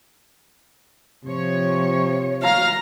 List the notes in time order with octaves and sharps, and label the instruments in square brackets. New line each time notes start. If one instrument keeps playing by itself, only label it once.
[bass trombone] C3 [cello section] F3 C#5
[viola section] F5 [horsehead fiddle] A#5